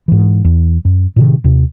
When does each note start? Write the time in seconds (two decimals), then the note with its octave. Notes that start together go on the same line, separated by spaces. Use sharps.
0.08 G#2 E3
0.44 E2
0.85 F#2
1.16 A2 C3 D#3
1.44 D#2 C3